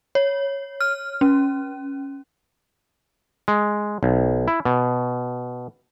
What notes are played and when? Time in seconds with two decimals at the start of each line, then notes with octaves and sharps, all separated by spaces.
0.15 C#5
0.81 F6
1.21 C#4
3.48 G#3
4.03 B1
4.48 E4
4.65 B2